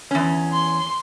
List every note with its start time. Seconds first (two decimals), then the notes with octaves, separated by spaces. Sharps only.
0.11 E2 C#4
0.54 C6